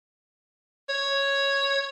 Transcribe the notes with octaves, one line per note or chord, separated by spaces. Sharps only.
C#5